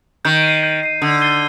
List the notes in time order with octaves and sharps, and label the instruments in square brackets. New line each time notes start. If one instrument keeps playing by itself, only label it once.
[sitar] D#3 [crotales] G6
[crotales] C7 D#7
G6
C7 D#7
[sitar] D3 [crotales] D#6
[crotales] A6 C7 D#7 G7